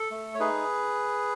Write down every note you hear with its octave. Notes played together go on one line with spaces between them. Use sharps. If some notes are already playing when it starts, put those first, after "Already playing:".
Already playing: A4
A3
C#5
D#4 G#4 B4